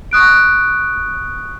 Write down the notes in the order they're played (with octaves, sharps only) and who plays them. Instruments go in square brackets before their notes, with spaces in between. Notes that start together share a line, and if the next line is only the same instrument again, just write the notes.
[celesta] C#6 D#6 F#6 D7